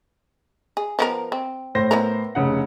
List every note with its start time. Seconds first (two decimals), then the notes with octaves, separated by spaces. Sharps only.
0.77 G#4
0.99 F3 B3 A#4
1.32 C4
1.75 A2 C5 A#6
1.91 B3 E4 A#4
2.35 F1 C#3 F#5